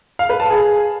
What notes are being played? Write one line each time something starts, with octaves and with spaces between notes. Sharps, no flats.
F5
B4
A5
G#4